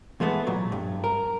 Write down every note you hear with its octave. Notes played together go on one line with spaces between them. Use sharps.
E2 G#3 A3 B3
A#2 F#3
G2
A#4